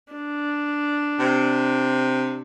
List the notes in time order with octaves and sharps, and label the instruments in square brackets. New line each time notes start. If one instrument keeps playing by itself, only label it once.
[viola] D4
[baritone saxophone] C3